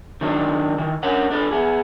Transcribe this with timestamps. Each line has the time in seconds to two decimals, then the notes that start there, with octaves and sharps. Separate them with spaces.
0.21 D#3 F#3 D4 D#4
0.78 D#3 E3
1.03 C#4 D4 A#4 C#5 F#5
1.31 D4 A4 B4
1.51 B3 G#4